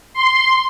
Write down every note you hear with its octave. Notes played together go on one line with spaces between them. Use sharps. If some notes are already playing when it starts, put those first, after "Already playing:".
C6